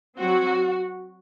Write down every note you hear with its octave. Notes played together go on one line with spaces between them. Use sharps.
F#3 C4 F#4